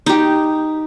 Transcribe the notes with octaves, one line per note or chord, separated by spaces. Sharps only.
D#4 G4